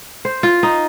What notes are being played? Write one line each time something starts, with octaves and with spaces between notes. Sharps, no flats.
C5
F4
D#4